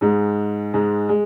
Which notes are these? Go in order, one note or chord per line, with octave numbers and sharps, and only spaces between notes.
G#2 G#3
G#2 G#3
G#3